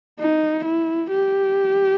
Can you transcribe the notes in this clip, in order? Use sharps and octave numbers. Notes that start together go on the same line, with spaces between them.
D#4
E4
G4